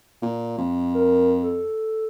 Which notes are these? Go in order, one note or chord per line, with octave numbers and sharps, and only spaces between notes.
A#2
F2
A#4
A4